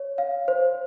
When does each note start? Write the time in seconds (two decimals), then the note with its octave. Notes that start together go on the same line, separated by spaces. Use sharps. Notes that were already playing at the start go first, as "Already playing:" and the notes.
Already playing: C#5
0.18 F5
0.48 C5